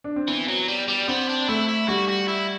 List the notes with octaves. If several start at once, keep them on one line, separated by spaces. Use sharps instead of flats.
D4
C4
E3 B3
F#3
G3
G3
B3 C4
D4
A3 E4
E4
G3 F#4
F#4
E4